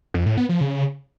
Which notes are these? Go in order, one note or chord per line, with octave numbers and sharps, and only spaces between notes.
F2
A2
B3
F3
C#3